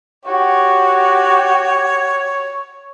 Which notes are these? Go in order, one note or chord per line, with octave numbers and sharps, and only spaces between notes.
F#4 G4 C#5